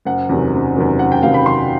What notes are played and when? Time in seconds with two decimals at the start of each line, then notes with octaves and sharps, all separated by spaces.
0.05 F#1 F#5
0.29 E2 C3 D#3 F#3
0.53 F#1
0.76 E2 C3 D#3 F#3
0.99 F#1 F#5
1.12 G5
1.23 E2 C3 D#3 F#3 F5
1.34 B5
1.46 F#1 C6